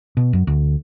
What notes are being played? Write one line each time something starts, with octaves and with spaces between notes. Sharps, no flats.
B2
F#2
D2